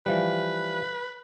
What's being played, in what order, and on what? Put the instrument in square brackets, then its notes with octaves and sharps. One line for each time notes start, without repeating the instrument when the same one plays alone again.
[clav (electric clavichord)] E3 F3 G3 [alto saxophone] B4